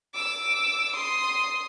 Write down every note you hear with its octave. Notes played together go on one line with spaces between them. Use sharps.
D6 E6
C6 D#6